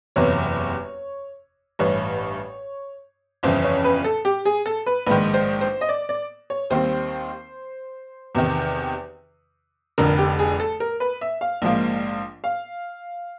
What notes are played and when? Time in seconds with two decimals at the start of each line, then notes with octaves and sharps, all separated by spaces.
0.16 F#1 E2 C3 E3 C#5
1.79 A1 G2 E3 C#5
3.43 G1 F2 C#3 E3 C5
3.64 C#5
3.84 B4
4.04 A4
4.25 G4
4.45 G#4
4.66 A4
4.86 B4
5.06 A#1 G#2 D#3 B4
5.34 C5
5.61 C5
5.81 D#5
5.89 D5
6.09 D5
6.50 C#5
6.70 D#2 D#3 G3 C4 C5
8.35 E2 C3 D#3
9.98 F1 F2 D3 A#4
10.18 G4
10.39 G#4
10.60 A4
10.80 A#4
11.00 B4
11.21 E5
11.41 F5
11.62 A#1 G#2 F3 A#3
12.44 F5